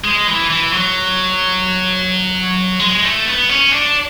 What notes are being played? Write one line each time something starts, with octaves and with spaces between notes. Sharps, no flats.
G#3
E3
E3
F#3
G#3
A3
B3
C#4
D4